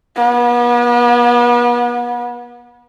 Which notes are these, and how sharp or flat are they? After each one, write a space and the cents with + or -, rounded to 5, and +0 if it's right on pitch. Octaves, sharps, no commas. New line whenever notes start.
B3 -40